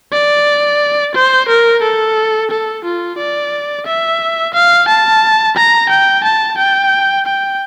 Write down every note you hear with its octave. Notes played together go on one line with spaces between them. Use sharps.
D5
C5
A#4
A4
A4
F4
D5
E5
F5
A5
A#5
G5
A5
G5
G5